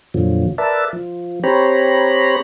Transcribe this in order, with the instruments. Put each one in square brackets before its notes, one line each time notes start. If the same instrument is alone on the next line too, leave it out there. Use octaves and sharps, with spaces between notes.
[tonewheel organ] F2 A#2 D3 F3 F#3
A#4 B4 D5 E5 A5
F3
C4 G4 C5 C#5 A#5 B5